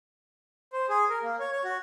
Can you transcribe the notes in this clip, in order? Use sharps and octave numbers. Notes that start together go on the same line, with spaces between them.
C5
G#4
A#4
A#3
C#5
C#5
F#4